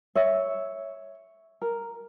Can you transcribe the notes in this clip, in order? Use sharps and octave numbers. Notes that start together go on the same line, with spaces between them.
C#5 E5
A#4